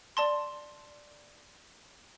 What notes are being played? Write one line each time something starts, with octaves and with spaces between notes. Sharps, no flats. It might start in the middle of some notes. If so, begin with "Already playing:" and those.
D5 A5 C6